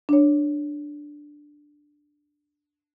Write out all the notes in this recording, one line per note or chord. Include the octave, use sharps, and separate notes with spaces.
D4 C#5